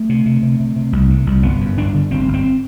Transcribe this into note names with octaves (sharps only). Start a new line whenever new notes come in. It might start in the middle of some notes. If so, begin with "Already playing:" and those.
Already playing: A3
C3
C3
C3
C3
C3
C2
C3
C2
G1 B3
F#2
G1 D4
D3
G1 C4
G1
C4